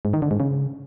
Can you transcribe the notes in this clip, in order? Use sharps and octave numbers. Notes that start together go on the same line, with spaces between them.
G#2
D#3
D3
G#2
C#3